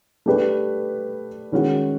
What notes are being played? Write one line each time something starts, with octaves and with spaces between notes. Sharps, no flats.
A3 D4 G4 B4
D#3 G#3 C#4 F#4